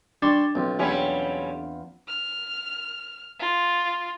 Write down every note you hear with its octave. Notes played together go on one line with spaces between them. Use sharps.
G3 D4 C6 C#6
B1 F3 C4
E2 F3 G3 C#4 E4 F4
F6
F4